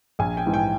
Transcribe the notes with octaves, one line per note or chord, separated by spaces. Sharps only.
A#1 G#5
G5
G#2 E3
G5